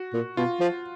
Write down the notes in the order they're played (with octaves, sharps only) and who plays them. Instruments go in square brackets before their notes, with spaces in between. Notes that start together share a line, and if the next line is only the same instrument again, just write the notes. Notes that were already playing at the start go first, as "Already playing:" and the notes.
Already playing: [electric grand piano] F#4
[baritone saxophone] A#2
[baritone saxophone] B2 [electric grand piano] F4
[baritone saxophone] F3